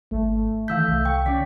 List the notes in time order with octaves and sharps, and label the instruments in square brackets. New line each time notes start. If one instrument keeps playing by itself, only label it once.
[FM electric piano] G#1 [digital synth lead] A3
[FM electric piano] D#3 E3 B6 [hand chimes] F5 E6 G6
[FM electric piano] C2
[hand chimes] G5 [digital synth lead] C#6
[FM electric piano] D3 [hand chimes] C#4 G5 B6 [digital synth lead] D5